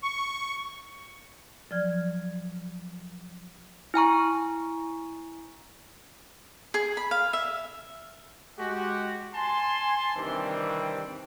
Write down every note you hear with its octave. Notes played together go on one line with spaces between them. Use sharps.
C#6
F3 F#3 D5 F6 G#6
E4 G#5 A#5 C#6
G#4
B5
F5
E5
G#3 F#4 G4
G#5 A5 C6
C3 D#3 E3 G3 C4 D4